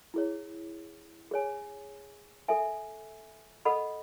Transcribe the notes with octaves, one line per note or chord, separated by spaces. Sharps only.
E4 G#4 C#5
G#4 C#5 G#5
A4 E5 G#5
A4 D#5 F#5 B5